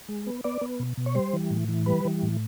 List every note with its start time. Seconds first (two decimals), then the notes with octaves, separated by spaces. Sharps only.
0.09 G#3
0.27 B3
0.44 B3 D5
0.61 B3
0.80 B2
0.97 B2
1.06 C#5
1.15 G3 C5
1.33 E3
1.51 A2
1.68 E3
1.86 G3 B4
2.05 E3
2.23 A2